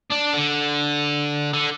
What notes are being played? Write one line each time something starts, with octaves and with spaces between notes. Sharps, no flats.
D4
D3
D3